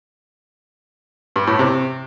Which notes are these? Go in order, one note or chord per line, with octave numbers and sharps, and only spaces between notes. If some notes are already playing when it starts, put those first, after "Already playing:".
G2
A2
C3